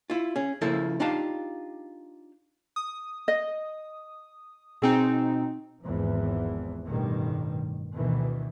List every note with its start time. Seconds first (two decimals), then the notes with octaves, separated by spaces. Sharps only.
0.10 E4 F4
0.36 C#4 G#4
0.61 C#3 F3 A#3 E4 A4
1.00 D4 D#4 F4 G4 F5 A5
2.76 D#6
3.28 D#5
4.82 B2 C4 D#4 G#4
5.83 G#1 E2 E3 F3
6.85 A1 G2 B2 D#3 G3
7.93 D2 B2 D#3 E3